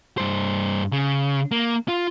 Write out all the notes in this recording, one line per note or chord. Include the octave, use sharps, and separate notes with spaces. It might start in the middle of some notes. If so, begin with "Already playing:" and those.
G2 C5
C#3
A#3
F4